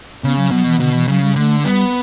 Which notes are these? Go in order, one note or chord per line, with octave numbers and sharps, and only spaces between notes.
C#3 B3
F#3
B2 F#3
E3
B2 D3
E3
C#3 F#3
G3
D3 A3
G3 B3